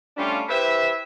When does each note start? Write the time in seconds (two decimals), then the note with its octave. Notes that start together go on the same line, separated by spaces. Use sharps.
0.17 G3 A3 C#4 D4 F4
0.49 E4 G4 B4 C5 E5